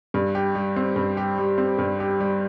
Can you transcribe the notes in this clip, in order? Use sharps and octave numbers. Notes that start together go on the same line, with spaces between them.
G2
G4
G3
C4
G2
G4
G3
C4
G2
G4
G3